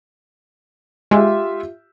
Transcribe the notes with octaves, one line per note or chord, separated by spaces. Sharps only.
G#3 F4 G4 E5